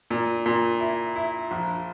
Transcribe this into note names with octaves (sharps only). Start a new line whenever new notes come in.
A#2
A#2
E4
E4
A#1